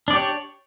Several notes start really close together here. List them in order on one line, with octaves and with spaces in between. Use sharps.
D4 D5 G4 C#5